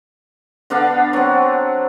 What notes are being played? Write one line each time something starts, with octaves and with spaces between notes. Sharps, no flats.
D3 B3 D4 F5
F#3 C4